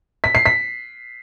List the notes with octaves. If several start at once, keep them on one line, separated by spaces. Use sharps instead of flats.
B6
C7
B6